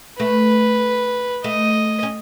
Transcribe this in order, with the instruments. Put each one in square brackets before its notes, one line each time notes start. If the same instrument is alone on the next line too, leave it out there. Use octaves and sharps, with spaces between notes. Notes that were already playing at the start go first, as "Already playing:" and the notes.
[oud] A3 [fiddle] B4
[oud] A3 [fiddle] D#5
[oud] C#4